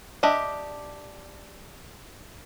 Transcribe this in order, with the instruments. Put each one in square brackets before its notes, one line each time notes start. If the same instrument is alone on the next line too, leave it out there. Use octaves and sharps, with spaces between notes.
[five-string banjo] D4 G4 D#5 E5